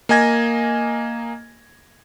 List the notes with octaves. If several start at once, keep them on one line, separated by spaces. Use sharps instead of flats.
A#3 D#5 G#5 G#6 A#6